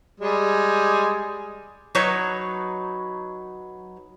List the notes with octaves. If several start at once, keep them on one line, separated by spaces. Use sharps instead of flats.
G3 G#3 G#4
F#3 D#4 B4 C#5